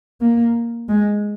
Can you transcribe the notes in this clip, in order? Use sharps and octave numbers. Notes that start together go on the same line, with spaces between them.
A#3
G#3